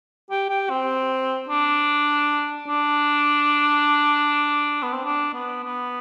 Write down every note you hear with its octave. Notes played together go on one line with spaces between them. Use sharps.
G4
G4
C4
D4
D4
B3
C4
D4
B3
B3